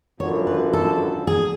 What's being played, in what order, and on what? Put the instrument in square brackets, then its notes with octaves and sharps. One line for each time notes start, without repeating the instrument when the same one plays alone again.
[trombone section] G#1 F#2 D3 F3 B3 [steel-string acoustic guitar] C#5
[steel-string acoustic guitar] B4
A4
G#4